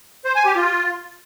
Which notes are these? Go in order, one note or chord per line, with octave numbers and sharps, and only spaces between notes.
C5
G#5
G4
F4